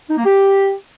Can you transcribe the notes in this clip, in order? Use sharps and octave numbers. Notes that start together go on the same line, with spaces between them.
D#4
A#3
G4